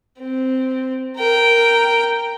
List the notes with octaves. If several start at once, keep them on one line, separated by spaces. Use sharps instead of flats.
C4
A#4 G5